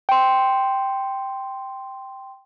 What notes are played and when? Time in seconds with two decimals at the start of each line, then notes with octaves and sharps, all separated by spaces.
0.09 G5 C6